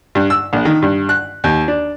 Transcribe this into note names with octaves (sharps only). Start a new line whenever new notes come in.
G2
E6
A#1
D#3
G2
F#6
D#2
D4